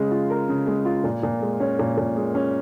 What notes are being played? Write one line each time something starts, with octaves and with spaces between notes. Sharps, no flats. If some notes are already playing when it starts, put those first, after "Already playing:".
Already playing: C#3 G#3
F4
A#4
C#3
G#3
F4
A#2
A#2
G#3
C#4
A#2
A#2
G#3
C#4